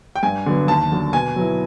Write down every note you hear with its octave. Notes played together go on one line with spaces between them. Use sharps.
G5
G2 G#5
D3 F#3 B3
D#2 A5
D3 F#3
B2 G#5
F#3 B3 E4